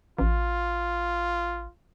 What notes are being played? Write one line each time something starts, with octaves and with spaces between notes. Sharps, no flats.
A1 F4